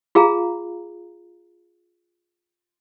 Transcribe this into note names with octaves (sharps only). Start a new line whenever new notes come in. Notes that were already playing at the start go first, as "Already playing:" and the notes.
F4 G#4 F5 A#5